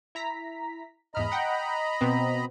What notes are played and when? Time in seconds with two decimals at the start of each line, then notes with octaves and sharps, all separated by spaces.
0.15 E4 A#5 B6
1.15 E2 G#2 D#5 A#5 B5 F6
1.32 F#5 G5
2.01 B2 B3 C4